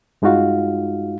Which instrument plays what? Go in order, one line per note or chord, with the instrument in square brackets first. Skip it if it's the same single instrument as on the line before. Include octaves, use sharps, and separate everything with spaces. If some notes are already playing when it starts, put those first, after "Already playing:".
[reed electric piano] G2 G#3 D#4 F4 F#4 F5